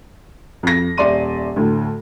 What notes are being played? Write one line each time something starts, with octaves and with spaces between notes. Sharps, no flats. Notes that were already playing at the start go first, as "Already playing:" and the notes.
F2 A#6
D#1 D5 E5 C6 D#7
D2 A2